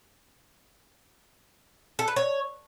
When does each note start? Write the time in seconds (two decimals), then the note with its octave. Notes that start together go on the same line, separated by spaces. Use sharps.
1.99 A4
2.08 B4
2.16 C#5